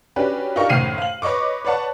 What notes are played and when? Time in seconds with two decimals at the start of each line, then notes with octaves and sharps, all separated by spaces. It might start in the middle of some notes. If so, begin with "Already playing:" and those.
0.16 C#4 D4 F#4 G4 B4
0.56 D4 D#4 F4 G4 A#4 C#6
0.69 F#1 A2 D#3 C7 D#7 F7
0.98 F5 F#7
1.22 B4 C#5 D#5 C#6 D6
1.65 B4 C#5 D5 F#5 A5